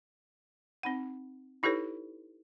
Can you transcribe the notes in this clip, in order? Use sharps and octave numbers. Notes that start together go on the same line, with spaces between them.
C4 D#4 F#5
D#4 E4 G4 A4 B4 C#5